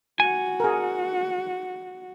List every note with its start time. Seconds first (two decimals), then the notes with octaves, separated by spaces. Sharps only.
0.20 F#4 G#5
0.60 G#4 A#4